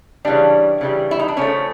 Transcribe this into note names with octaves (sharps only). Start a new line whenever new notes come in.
C#3 E3 G3 D4
C#3 E3 G3
E4
D#4
D4
C#3 F3 A3 C#4